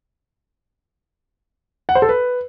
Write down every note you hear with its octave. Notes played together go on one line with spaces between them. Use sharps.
F#5
C5
A4
B4